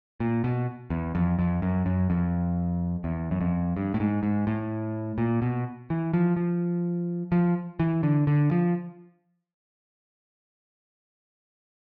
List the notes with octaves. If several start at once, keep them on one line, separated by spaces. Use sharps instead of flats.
A#2
B2
E2
F2
F2
F#2
F#2
F2
E2
F#2
F2
G2
A2
G#2
G#2
A2
A#2
B2
E3
F3
F3
F3
E3
D3
D3
F3